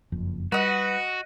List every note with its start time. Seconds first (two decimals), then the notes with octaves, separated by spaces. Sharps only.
0.12 F#1 F2
0.52 G3 F#4 B4 D#5 F#5